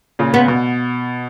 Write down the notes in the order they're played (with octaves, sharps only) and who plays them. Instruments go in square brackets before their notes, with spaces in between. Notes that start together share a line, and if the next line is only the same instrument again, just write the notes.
[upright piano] A#2 C#3
[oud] B3
[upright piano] B2